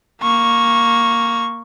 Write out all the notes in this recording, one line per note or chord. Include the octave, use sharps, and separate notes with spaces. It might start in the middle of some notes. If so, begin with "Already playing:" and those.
A#3 C#6